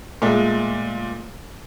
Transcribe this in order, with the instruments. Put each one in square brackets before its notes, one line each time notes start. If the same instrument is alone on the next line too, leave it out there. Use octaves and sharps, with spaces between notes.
[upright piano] A#2 G#3 A3